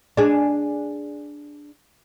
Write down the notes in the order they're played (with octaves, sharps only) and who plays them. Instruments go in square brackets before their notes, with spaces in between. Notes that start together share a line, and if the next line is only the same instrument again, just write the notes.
[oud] D4 G#4